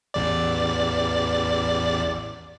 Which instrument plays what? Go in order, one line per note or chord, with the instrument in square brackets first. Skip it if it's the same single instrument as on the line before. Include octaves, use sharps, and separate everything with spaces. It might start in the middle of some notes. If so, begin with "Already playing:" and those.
[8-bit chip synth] A1 E2 D5